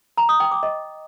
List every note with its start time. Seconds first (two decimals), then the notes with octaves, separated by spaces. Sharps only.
0.18 A#5
0.29 D#6
0.40 G5
0.51 D6
0.63 D#5